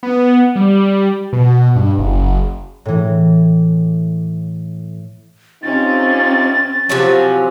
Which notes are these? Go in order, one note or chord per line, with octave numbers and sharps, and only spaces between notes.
B3
G3
B2
G2
F#1
A2 E3
C3 C4 C#4 D#4 F4 A6
C3 F3 F#3 C#4